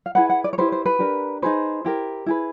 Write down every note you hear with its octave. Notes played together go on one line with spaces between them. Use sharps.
F5
E4 G#4 B4 F#5
F#5
D5
C#5
E4 G4 B4 C5
C5
B4
D4 G4 A#4
D#4 G#4 B4 C5
E4 G4 A#4
E4 G#4 B4